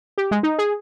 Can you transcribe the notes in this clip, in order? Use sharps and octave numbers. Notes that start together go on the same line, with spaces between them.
G4
G#3
D#4
G#4